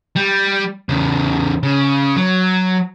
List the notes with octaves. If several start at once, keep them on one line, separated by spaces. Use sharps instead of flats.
G3
E2 C#3
C#3
F#3